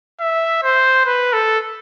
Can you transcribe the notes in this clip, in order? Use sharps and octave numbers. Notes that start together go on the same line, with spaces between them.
E5
C5
B4
A4